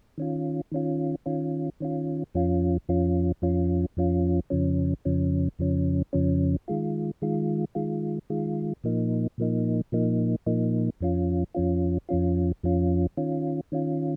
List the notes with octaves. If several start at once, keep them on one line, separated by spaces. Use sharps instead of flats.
D#3 C#4 F4
D#3 C#4 F4
D#3 C#4 F4
D#3 C#4 F4
F2 F3 C#4 F4
F2 F3 C#4 F4
F2 F3 C#4 F4
F2 F3 C#4 F4
F2 C#3 F3 C#4
F2 C#3 F3 C#4
F2 C#3 F3 C#4
F2 C#3 F3 C#4
D#3 G#3 F4
D#3 G#3 F4
D#3 G#3 F4
D#3 G#3 F4
A#2 F3 A#3 D#4
A#2 F3 A#3 D#4
A#2 F3 A#3 D#4
A#2 F3 A#3 D#4
F2 F3 C#4 F4
F2 F3 C#4 F4
F2 F3 C#4 F4
F2 F3 C#4 F4
D#3 C#4 F4
D#3 C#4 F4